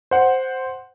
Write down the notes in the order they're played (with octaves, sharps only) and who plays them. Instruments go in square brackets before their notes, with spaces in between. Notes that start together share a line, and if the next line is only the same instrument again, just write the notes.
[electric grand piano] C5 F#5